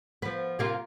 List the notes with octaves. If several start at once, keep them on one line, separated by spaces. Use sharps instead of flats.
F3 B3
C3 A#3 F4